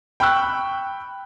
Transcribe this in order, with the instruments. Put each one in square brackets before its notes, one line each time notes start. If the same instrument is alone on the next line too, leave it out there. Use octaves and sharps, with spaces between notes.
[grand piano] G5 B5 C#6 E6 F#6